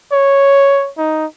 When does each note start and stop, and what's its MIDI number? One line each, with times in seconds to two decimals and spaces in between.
0.12 0.90 73
0.98 1.26 63